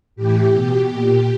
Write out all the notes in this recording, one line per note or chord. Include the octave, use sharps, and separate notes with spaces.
A2 E3 G4
B2
A#2